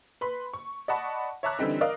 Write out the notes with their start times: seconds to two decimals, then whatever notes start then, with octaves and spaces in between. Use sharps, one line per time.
0.21 B4 B5 C6
0.53 C#6
0.88 D5 D#5 F#5 A5 B5 C#6
1.43 C#5 E5 A5 A#5 D6 F#6
1.59 D3 E3 G3 C4 D#4
1.81 A#4 D5 D#5 F5